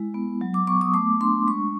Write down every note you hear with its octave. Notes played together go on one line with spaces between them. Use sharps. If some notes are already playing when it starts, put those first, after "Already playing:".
Already playing: G#3 E4
B3
F#3
D6
B3 C#6
D#6
A3 D6
D4 C6
G#3 C#6